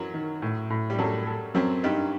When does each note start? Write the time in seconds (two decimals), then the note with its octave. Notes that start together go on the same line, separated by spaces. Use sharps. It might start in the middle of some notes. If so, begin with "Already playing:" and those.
Already playing: F#2 E3 F#3
0.14 D#3
0.42 A2
0.70 A2
0.90 G3
0.98 F#2 F#3 A4
1.26 A4
1.55 F#2 F#3 C4
1.83 G2 G3 D#4